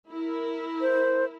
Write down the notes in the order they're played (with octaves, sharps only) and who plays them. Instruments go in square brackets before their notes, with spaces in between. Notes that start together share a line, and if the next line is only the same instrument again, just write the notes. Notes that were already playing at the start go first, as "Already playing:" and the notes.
[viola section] E4 A#4
[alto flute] C5